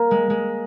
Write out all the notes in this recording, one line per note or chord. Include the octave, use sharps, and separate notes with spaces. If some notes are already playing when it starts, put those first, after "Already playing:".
Already playing: A#3
G#3
G#3